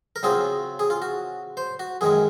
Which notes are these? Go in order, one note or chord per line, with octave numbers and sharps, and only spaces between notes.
A#4
C#3 F#3 C4 F4 G#4
G#4
F4
F#4
C5
F#4
F#2 D#3 G#3 G#4